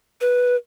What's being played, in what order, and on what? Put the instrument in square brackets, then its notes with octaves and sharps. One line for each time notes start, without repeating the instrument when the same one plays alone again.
[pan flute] B4